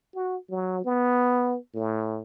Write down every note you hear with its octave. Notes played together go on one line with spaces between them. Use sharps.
F#4
F#3
B3
A2